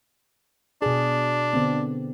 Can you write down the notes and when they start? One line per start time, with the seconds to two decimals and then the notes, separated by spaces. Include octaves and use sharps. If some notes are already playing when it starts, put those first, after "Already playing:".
0.82 B2 D4 G#4
1.53 D3 B3 C4